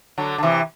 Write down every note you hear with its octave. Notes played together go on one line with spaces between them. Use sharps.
D3 F#3
D3
C3 E3